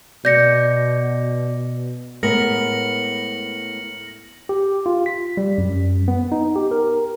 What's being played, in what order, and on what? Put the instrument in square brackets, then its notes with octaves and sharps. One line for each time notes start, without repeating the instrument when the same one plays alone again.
[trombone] B2 [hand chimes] D5 [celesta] G6 A#6 C#7
[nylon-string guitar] A2 B3 [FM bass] G#3 [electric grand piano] A#4 [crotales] A#6 C#7 F#7
[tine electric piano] G4
F4
B6
G3
F#2
B3
D#4
G4
A#4